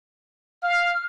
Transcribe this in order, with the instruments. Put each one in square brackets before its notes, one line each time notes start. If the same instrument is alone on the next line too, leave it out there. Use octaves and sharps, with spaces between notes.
[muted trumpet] F5 [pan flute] F6